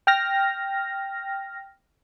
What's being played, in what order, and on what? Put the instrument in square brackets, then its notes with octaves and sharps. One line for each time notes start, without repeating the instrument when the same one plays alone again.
[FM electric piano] G5 F6 A#6